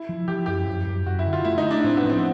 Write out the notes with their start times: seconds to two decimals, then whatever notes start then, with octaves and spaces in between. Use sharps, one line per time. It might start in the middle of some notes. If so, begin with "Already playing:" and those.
Already playing: E4
0.09 F3
0.28 F3 G4
0.46 F#2 G4
0.67 F#2
0.87 F#2
1.06 F#2 F#4
1.19 E4
1.26 D3
1.33 F4
1.45 A3 E4
1.58 D#4
1.65 A3
1.71 D4
1.84 A2 C4
1.97 B3
2.04 F3
2.10 C4